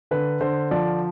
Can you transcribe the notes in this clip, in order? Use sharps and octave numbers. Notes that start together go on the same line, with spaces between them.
D3 B4
D3 C5
F3 D5